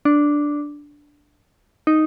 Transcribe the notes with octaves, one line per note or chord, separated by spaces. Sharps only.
D4
D#4